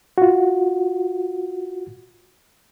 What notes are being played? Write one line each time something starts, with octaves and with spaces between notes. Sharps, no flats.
F4 F#4